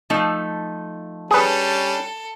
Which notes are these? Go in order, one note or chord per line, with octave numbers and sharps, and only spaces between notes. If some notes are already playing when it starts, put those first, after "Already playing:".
F3 A3 D#4
G3 C#4 D4 G#4 A4 B4